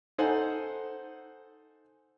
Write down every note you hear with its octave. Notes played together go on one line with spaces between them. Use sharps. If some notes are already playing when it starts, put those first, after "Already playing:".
D#4 A4 C5 F#5 G#5